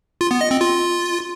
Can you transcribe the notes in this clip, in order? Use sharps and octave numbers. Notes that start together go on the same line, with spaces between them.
F4
B3
D#5
C4
F4